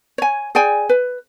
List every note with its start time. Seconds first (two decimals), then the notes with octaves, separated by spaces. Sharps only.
0.18 C#5 G#5
0.55 G#4 D5 G5 G#5
0.89 B4